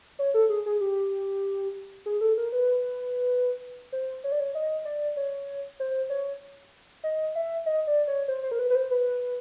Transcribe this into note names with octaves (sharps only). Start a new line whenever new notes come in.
C#5
A4
G#4
G#4
G4
G#4
A4
A#4
B4
C5
C#5
D5
C#5
D#5
D5
C#5
C5
C#5
D#5
E5
D#5
D5
C#5
C5
C5
A#4
B4
B4
C5
B4